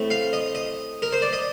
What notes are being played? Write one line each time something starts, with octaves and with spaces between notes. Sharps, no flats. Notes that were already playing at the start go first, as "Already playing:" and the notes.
Already playing: A2 A3 C4
F5
D#5
D#5
A#4
C5
D5
D#5